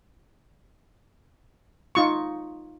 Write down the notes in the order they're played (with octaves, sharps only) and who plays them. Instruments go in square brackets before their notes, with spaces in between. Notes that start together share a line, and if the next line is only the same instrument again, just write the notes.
[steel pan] D#4 F4 C#6